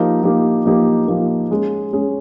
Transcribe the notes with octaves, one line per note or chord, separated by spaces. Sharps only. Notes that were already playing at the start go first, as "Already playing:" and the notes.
Already playing: F3 A#3 D#4 G4 A#4
F3 A#3 D#4 G4 A#4
F3 A#3 D#4 G4 A#4
F3 A#3 D#4 G4 A#4
G#3 C#4 G#4
G#3 C#4 G#4